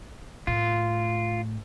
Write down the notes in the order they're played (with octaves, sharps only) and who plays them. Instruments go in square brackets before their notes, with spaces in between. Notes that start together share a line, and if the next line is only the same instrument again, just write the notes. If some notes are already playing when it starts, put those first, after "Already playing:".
[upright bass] A2 [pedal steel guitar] F4